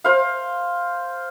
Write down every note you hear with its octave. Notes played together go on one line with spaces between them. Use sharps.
C5 F5